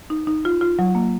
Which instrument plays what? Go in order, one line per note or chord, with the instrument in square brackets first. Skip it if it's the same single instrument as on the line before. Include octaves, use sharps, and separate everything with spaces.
[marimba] D#4
D#4
F4
F4
F#3
A#3